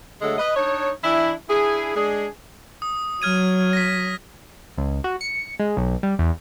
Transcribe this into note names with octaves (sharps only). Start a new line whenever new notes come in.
D3 F#3 G#3 A3 A4
B4 D#5
D4 D#4 C#5
E3 D4 E4
D4 E4 G#4
G#3 D4 G#4
D#6
F#3 F6 G#6 D#7
A#6 B6
C#2
F#4
C#7
G#3
B1
G3
E2